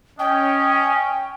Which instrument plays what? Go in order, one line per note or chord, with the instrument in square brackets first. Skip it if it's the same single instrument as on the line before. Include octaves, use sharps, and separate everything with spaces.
[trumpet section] C#4 [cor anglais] D#5 [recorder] G5